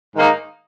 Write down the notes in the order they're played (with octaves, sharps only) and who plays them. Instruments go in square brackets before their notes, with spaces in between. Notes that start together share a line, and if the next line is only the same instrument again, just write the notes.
[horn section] G#2 D#3 A#3 D#4